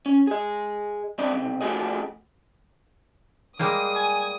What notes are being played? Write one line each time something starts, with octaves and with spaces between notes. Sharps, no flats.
C#4
G#4 D#5
F#2 C4 D4 D#5
B1 C3
F3 A3 C4 F#4 G#4 D#5
G3 G#3 A#3 D#6
G#5